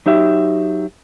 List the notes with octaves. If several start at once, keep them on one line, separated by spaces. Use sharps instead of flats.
F#3 D#4 G4 E5